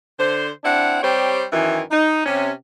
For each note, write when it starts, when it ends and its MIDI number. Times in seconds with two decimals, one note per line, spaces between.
0.19 0.50 50
0.19 0.50 72
0.64 1.01 60
0.64 1.01 62
0.64 1.01 64
0.64 1.01 78
1.02 1.43 55
1.02 1.43 60
1.02 1.43 67
1.02 1.43 72
1.02 1.43 73
1.53 1.81 42
1.53 1.81 51
1.53 1.81 52
1.91 2.24 63
2.26 2.51 48
2.26 2.51 61